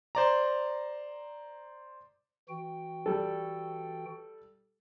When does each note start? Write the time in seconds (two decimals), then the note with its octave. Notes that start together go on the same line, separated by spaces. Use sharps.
0.15 C5 D5 A#5
2.49 E3 F#4 G5
3.06 G3 A4